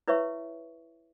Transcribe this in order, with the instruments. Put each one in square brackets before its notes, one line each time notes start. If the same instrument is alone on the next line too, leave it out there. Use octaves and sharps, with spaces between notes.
[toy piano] E4 B4 C#5 E5 C#6